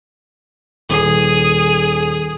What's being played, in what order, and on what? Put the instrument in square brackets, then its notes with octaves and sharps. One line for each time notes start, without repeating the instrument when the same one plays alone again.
[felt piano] D#1 C7 [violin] G#4